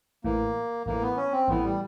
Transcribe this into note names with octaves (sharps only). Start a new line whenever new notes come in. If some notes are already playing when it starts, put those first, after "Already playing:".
A1 A2 E3 A#3
A1 A2 E3 A#3
B3
C#4
C4
A1 A2 E3 B3
G3